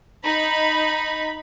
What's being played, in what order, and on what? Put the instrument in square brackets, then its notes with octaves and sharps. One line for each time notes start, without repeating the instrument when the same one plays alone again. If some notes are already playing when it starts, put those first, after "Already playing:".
[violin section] D#4 B5